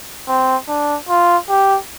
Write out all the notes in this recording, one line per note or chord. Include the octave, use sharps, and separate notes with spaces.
C4
D4
F4
G4